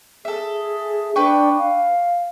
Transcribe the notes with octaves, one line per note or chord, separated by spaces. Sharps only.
G#4 A4 E5
D4 B4 G5 C#6
F5